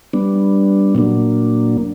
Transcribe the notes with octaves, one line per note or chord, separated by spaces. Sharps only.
G3 B3 D4
A#2 F#3 A#3 D4